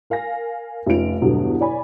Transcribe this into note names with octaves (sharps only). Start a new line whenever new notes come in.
A#4 F5 G#5 A#6
F1 C#4 D#4 F4 D7 F7
E2 G2 B2 D3 F#3 A3
E4 C#5 D5 G#5 B5